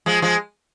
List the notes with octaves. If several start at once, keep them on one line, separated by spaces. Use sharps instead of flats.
F3 G#3
F3 G#3